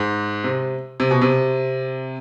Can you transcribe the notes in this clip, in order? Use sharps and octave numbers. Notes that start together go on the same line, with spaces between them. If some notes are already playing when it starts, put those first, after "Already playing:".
Already playing: G#2
C3
C3
B2
C3